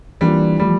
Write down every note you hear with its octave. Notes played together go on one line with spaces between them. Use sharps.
E3 G3 A#3 D4 F4
F3 G3 A3